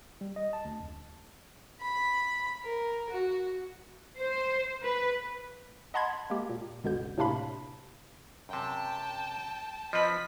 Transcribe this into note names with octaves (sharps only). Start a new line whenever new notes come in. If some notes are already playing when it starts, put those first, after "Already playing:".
G3
D#5
A5
D2
F2
B5
A#4
F#4
C5
B4
D#5 F#5 A5 B5 C6 G#6
G#3 A#3 G4
A#2
G1 C#2 B2 D3 G6
A2 C3 A#3 D4 F5 B5
F#2 C3 G5 A5
F3 C4 B4 D#5 B5 B6